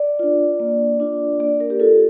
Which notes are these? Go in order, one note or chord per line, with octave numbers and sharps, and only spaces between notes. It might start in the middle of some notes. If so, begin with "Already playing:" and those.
Already playing: D5
D4 F4
A#3
D4 F4
A#3 D5
A#4
G4
F4 A4